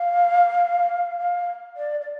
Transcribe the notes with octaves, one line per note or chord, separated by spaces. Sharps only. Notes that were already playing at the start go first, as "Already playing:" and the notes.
Already playing: F5
F5
D5
D5